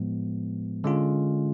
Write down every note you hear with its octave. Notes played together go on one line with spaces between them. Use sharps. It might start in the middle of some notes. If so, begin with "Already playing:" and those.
Already playing: A2 F3 G#3 B3
D3 G#3 C#4 F4